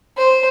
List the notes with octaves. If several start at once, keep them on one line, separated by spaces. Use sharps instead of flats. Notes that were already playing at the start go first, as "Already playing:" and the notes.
C5